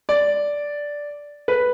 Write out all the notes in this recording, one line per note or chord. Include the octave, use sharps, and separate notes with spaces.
D5
B4